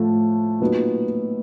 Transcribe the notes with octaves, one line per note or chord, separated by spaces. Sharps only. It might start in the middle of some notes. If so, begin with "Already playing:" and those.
Already playing: A2 F3 A3
A#2 F#3 B3 D#4